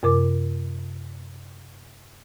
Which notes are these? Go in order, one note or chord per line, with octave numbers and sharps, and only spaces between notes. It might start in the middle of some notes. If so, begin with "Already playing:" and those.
F#2 C3 A#4 D6